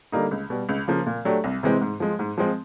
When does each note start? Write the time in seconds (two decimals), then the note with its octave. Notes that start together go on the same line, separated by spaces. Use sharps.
0.12 D3 G3 A#3 D#4
0.31 C#2
0.50 B2 G3
0.69 C#2
0.88 C#3 F3 A#3
1.06 A#2
1.25 F#3 A3 D4 G4
1.44 C2
1.63 C3 E3 G#3 C4
1.81 G#2
2.00 F3 G#3
2.19 G#2
2.38 F3 G#3 C4